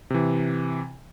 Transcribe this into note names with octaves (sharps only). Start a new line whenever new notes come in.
C3 E3